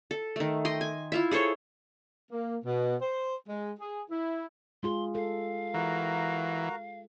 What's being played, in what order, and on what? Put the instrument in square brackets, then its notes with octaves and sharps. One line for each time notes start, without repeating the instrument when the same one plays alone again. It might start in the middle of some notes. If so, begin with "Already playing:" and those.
[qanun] A4
D#3 A3
D#5 G5 C6
G#5
E4 F4 E5
G#4 A4 C5 C#5
[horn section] A#3
B2
C5
G#3
G#4
E4
[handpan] G#3 F4 G#4 [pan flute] C6
[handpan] A4 [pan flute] F5
[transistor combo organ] E3 [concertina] F#4 A#4 A#5